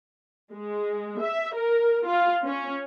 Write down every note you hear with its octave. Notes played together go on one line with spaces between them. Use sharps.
G#3
E5
A#4
F4
C#4